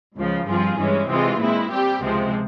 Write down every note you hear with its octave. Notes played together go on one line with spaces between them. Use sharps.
C#2 C#3 F3
G2 F3 C4 F4 G#4
G2 E3 G#3 C#4
C3 E3 G#3 C4 F4
A#2 G#3 C4 E4
G3 C4 G4
C#2 C3 F3 G#3 C4